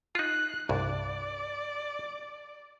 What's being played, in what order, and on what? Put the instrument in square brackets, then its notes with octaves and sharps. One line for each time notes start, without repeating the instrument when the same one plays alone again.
[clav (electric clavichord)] D#4 F4 [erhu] F#6
[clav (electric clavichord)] C2 G2 [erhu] D5